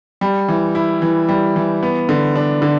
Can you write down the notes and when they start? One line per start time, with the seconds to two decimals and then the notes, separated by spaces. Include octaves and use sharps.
0.21 G3
0.48 E3
0.75 E4
1.02 E3
1.29 G3
1.56 E3
1.83 B3
2.09 D3
2.36 D4
2.62 D3